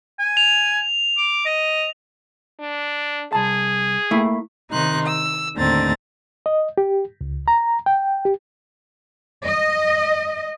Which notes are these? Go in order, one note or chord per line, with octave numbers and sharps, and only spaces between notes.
G#5
F7
D6
D#5
D4
C2 G#4 A5
A3 A#3 E4
C3 D#3 D#4 C6 F#6
E6
D#2 A2 D3 C4 A#5 A6
D#5
G4
C#2
A#5
G5
G4
D#5